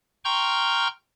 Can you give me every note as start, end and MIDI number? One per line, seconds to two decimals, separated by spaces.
0.25 0.88 79
0.25 0.88 82
0.25 0.88 84
0.25 0.88 85
0.25 0.88 89
0.25 0.88 91